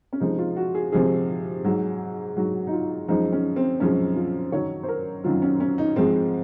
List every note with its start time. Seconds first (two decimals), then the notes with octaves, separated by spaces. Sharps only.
0.13 C#4
0.20 C3 F3 G#3 D#4
0.39 F4
0.56 F#4
0.74 G#4
0.92 C3 F3 G#3 G#4
1.64 G#2 F#3
2.36 G#2 F#3 F#4
2.67 D#4
2.73 F4
3.08 F#2 F3 G#3 D#4
3.32 C#4
3.56 C4
3.80 F#2 F3 G#3 C#4
4.16 F4
4.52 F#2 D#3 F#3 C#5
4.83 C5
4.88 A#4
5.24 F#2 D#3 F#3 F4
5.42 C#4
5.60 C#4
5.78 D#4
5.96 G#2 F3 G#3 C4